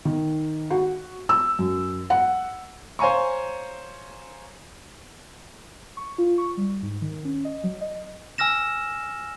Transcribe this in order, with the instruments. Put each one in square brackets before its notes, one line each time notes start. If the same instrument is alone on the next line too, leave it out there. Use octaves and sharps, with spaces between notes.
[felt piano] D#3
F#4
E6
F#2
F#5
[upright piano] C5 C#5 F5 G#5 A#5 C#6
[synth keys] C#6
F4
C#6
G3
G#2
D#3
C#4
D#5
F#3
D#5
[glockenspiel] G#5 E6 F6 A#6 E7